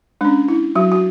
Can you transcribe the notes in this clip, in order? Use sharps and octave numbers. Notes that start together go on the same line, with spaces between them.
G#3 C#4 D4
E4
F#3 F#4
F#4